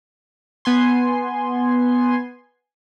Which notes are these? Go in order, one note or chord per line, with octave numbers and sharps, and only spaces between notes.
B3 G#5 C6